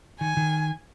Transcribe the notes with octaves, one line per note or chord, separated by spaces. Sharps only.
D#3 G#5
D#3